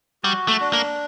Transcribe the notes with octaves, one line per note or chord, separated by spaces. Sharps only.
G3 F#4
A3
D4
A#3